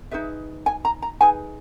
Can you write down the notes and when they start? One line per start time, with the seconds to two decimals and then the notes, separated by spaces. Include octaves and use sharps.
0.11 D#4 G#4 B4 E5
0.66 G#5
0.85 A#5
1.02 A#5
1.21 D#4 G#4 B4 G#5